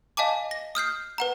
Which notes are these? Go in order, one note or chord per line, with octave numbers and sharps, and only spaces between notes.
D#5 F5 G#5 A5 D6
A#6
D#6 F6 G6 C7
B4 F#5 A#5